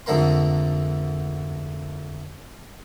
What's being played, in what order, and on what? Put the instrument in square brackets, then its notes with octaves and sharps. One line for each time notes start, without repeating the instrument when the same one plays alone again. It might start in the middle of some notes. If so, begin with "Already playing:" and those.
[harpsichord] F2 G#2 D3 A3 A#4 C6